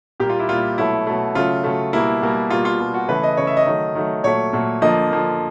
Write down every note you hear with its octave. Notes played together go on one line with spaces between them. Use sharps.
A#2 G3 A#3 G4
F4
E4
A#2 G3 A#3 F4
B2 F#3 A3 E4
B2 F#3 A3
C#3 F#3 A3 F4
C#3 F#3 A3
B2 G3 A#3 E4
B2 G3 A#3
B2 G3 A#3 F4
F4
B2 G3 A#3
F#4
C#3 E3 A3 B4
D#5
C#3 E3 A3 C#5
E5
D#5
D#3 F#3 A3
D#3 F#3 A3
A#2 F#3 A3 C#5
A#2 F#3 A3
D3 F3 A#3 D#5
D3 F3 A#3